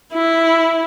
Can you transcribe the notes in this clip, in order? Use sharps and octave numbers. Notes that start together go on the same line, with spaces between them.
E4